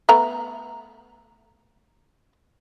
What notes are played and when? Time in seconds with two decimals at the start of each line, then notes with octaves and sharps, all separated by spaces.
0.09 A3 B3 A#5